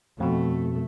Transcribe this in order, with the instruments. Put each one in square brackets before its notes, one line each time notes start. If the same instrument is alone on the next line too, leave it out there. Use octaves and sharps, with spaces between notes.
[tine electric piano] F2 B2 F3 [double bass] A3